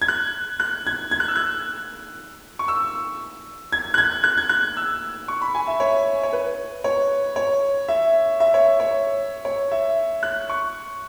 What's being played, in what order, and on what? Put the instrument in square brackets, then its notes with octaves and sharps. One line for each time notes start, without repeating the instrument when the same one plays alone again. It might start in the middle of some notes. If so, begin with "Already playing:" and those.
[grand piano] G#6
F#6
F#6
G#6
G#6
F#6
E6
F#6
C#6
E6
G#6
F#6
G#6
F#6
G#6
F#6
E6
C#6
B5
G#5
E5
C#5
C#5
B4
C#5
C#5
E5
E5
C#5
C#5
C#5
E5
F#6
C#6